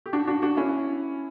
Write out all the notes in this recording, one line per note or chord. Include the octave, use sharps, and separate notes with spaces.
G4
D4 F#4
D4 F#4
D4 F#4
C#4 E4